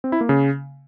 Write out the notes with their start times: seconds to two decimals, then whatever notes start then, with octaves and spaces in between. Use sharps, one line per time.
0.04 C4
0.12 E4
0.21 A#3
0.29 C#3